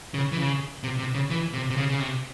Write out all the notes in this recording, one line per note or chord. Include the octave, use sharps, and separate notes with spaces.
C#3
E3
C#3
C3
C3
C#3
E3
C3
C3
C#3
C#3
C3